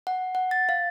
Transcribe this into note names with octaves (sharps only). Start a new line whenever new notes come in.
F#5
F#5
A6
F5